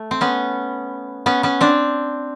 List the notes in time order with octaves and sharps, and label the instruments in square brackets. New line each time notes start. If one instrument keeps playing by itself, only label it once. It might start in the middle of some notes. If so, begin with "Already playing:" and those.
Already playing: [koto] A3
C4
B3 C#4
B3 C#4
B3 C#4
C4 D4